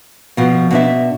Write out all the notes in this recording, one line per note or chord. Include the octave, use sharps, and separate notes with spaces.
B2 F3
B2 D4 E5